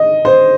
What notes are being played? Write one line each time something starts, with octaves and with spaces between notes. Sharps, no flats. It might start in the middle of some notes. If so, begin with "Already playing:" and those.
Already playing: D#5
C5